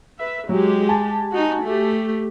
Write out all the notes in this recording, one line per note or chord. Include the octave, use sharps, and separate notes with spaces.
B4 E5
F#3 G#3 G4
G#5 A5
D#4 F#4
A3 G4